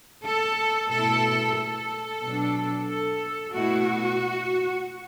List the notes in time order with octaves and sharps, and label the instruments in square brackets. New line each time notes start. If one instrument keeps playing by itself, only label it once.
[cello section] A4
B2 A3 E4 A4
A4
B2 F#3 D4
A4
B2 A3 E4 F#4